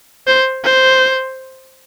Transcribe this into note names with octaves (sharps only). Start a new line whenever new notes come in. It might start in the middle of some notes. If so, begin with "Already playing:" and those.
C5
C5